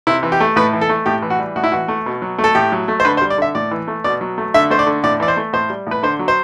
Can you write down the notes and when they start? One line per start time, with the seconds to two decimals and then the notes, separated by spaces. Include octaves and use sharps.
0.07 C3 E4
0.23 E3
0.32 G4
0.40 A3
0.56 A2 B4
0.73 E3
0.81 A4
0.89 A3
1.06 A2 G4
1.22 E3
1.30 F#4
1.39 G3
1.56 A2 F#4
1.64 E4
1.72 E3 F#4
1.88 A3
2.06 B2
2.22 F#3
2.38 A3
2.44 A4
2.55 A2 G4
2.72 F#3
2.88 A3
3.00 C5
3.05 D3 B4
3.17 C5
3.21 G3
3.30 D5
3.38 D3 E5
3.55 A2 D5
3.71 E3
3.88 A3
4.04 B2 D5
4.21 F#3
4.38 A3
4.54 D3 E5
4.70 A3 C5
4.79 D5
4.87 D3
5.04 A2 D5
5.20 E3 D5
5.28 C5
5.37 A3
5.53 A2 C5
5.70 G3
5.87 A2 B4
6.03 D3 C5
6.19 F#3
6.28 C5